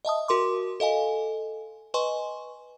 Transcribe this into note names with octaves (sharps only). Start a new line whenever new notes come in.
D#5 E5 A5 D#6
F#4 A#4 C6 D6
A4 D#5 F5 G#5
B4 D#5 G#5 C6 C#6